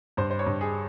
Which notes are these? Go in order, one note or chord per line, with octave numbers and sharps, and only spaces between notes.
G2 C5
C5
C#5
G2
G#4